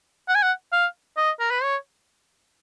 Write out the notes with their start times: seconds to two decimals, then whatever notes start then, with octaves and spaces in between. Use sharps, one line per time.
0.29 F#5
0.35 G#5
0.43 F#5
0.73 F5
1.17 D#5
1.40 A#4
1.51 B4
1.63 C#5